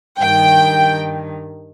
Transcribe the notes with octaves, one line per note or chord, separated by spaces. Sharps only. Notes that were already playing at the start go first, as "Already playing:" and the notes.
G2 D#3 G5